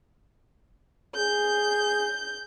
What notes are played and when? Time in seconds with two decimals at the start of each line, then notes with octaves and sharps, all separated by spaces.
1.16 G#4 G6